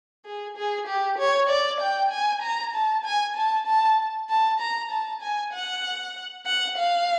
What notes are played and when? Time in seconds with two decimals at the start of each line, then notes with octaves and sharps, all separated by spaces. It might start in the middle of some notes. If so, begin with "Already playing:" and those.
0.25 G#4
0.57 G#4
0.87 G4
1.18 C#5
1.49 D5
1.80 G5
2.11 G#5
2.42 A#5
2.74 A5
3.04 G#5
3.36 A5
3.67 A5
4.30 A5
4.60 A#5
4.91 A5
5.22 G#5
5.53 F#5
6.46 F#5
6.78 F5